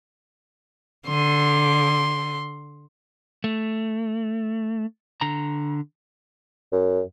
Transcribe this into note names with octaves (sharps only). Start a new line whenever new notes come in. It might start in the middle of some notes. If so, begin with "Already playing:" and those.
D3 C6
A3
D3 A#5
F#2